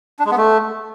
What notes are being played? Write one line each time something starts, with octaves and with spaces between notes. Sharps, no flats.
D4
G#3
B3
A3